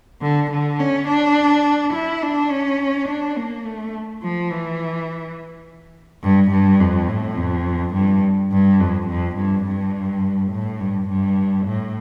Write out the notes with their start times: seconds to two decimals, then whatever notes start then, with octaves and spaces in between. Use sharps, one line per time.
0.22 D3
0.51 D3
0.80 C#4
1.08 D4
1.94 E4
2.22 D4
2.51 C#4
3.09 D4
3.37 A#3
3.66 A3
4.22 F3
4.51 E3
6.23 G2
6.51 G2
6.80 F2
7.08 A2
7.37 F2
7.94 G2
8.52 G2
8.80 F2
9.09 F2
9.37 G2
9.66 G2
10.52 A2
10.80 G2
11.09 G2
11.66 A2